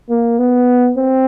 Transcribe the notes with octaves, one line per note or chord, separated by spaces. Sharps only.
A#3
B3
C4